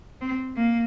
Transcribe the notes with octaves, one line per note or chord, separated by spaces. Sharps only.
C4
A#3